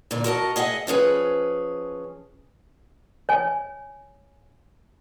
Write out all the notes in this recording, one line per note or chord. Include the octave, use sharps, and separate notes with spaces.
A#2 D3
F#4 A#4 D#5 A5
G#4 D#5 E5 F#5
F3 C#4 G#4 B4
C#5 G#5